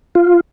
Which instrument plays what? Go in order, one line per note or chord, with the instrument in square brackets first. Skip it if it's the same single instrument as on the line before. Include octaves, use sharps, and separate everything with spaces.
[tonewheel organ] F4